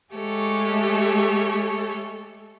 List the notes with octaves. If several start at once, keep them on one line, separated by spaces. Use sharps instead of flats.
G#3 A3 G4 A4 C#5